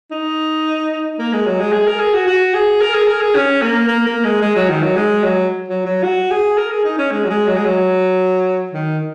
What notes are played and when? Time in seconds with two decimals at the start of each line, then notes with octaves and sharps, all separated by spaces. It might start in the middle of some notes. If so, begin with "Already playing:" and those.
0.11 D#4
1.19 A#3
1.33 G#3
1.46 F#3
1.60 G#3
1.73 G#4
1.87 A#4
2.00 G#4
2.14 F#4
2.27 F#4
2.54 G#4
2.81 A#4
2.94 G#4
3.07 A#4
3.21 G#4
3.35 C#4
3.62 A#3
3.88 A#3
4.06 A#3
4.25 G#3
4.42 G#3
4.56 F#3
4.69 D#3
4.83 F#3
4.96 G#3
5.23 F#3
5.69 F#3
5.86 F#3
6.04 F#4
6.31 G#4
6.58 A#4
6.71 G#4
6.84 D#4
6.98 C#4
7.11 G#3
7.24 F#3
7.30 G#3
7.48 F#3
7.57 G#3
7.65 F#3
8.73 D#3